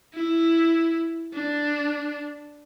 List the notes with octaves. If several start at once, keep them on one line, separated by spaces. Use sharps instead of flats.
E4
D4